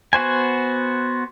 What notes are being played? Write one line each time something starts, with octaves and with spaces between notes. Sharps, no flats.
B3 F#4 C5 G#5